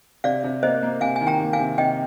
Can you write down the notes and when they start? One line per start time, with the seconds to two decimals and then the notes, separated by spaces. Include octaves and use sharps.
0.24 C3 D5 F5
0.44 C3
0.63 A#3 C5 D#5
0.83 A#3
1.01 C3 F5 G#5
1.16 G#5
1.21 D#3
1.27 G5 A#5
1.40 A#3
1.53 F5 G#5
1.59 C3
1.78 C3 D#5 G5